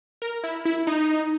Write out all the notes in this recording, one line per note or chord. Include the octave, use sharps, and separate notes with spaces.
A#4
E4
E4
D#4